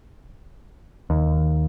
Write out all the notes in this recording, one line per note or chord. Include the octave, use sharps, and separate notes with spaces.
D#2